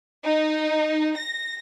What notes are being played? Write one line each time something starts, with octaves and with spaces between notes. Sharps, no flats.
D#4
A#6